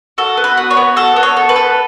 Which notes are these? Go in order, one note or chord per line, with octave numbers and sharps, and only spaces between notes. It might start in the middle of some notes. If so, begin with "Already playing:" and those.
F#4 A4
B3
B4
F#4
C#5
B3
F#4 A4
B3
C#5
A4
B4
A4